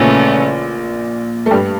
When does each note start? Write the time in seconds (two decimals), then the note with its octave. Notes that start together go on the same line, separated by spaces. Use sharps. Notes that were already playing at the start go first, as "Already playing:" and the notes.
Already playing: A#1 A#2 C#3 E3 A3 C#4
1.46 A3
1.51 G2 G3